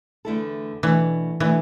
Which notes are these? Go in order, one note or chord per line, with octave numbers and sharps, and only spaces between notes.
E2 D3 A3 E4 A4
B2 E3 A3 D4
B2 E3 A3 D4